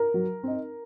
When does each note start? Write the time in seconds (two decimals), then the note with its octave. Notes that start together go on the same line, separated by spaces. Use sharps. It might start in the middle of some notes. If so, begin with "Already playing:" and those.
Already playing: A#4
0.14 F#3
0.43 C4 D#4